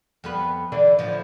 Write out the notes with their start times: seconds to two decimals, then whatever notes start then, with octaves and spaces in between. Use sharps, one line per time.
0.24 F2 B3 B4
0.72 D3 E3 D4
0.99 D2 A2 F3